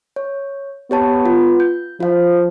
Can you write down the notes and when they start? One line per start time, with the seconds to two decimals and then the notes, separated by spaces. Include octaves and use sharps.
0.16 C#5
0.91 B3 G4 C#5 A5
1.25 F4
1.60 G6
2.00 F3 F4 F5